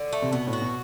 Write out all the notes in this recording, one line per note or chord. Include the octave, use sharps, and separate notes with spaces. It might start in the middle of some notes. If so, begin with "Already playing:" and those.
Already playing: D3
A3
C3
B2 B3
A2
F#4
B2